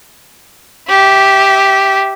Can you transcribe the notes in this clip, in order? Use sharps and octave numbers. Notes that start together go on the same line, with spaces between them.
G4 E5